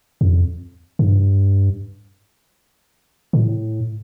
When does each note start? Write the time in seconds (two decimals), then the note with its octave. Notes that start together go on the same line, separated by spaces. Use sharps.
0.21 F2
0.99 G2
3.33 A2